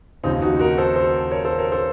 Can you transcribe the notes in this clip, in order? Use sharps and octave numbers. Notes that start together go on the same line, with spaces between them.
D#2 C#3 F3 C4 D#4
D#4 F#4
F#4 A#4
A4 C5
A4 C5
A#4 C#5
A4 C5
A#4 C#5
A4 C5